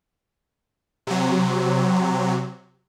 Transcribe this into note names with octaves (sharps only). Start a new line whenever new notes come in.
C3 F#3